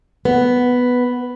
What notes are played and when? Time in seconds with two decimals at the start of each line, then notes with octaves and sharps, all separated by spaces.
0.25 B3